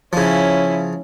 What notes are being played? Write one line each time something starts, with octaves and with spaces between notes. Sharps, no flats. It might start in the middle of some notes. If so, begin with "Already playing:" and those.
C#3 F3 C#4 E4